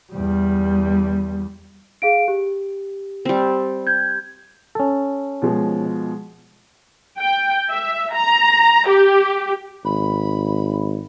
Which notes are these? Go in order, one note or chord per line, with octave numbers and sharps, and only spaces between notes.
E2 G3
G#4 F5 D7
G4
G3 C4
G6 G#6
C#4 A4
B2 F3 G#3
G5
E5
A#5
G4
G#1 B5